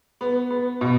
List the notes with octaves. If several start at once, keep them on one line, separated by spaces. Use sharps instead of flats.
B3
B3
B2